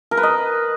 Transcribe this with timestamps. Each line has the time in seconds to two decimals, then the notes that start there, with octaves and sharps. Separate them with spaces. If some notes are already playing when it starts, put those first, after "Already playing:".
0.11 A#4
0.17 B4
0.23 D#5